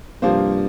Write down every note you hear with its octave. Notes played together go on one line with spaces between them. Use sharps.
G2 C3 F3 A#3 F4 C5